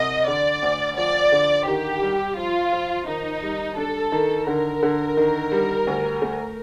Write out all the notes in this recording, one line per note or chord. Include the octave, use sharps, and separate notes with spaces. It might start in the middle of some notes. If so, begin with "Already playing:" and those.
Already playing: C2 D#5
D3 D5
D2
F3 D5
D3
D#3 G4
G3
F3 F4
F3
D#3 D#4
G3
D4 A4
D#3
D3 A#4
D3
D#3
G3
D2
A3